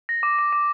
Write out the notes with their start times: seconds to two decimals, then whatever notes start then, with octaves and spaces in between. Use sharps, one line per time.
0.09 A#6
0.23 D6
0.39 D6
0.53 D6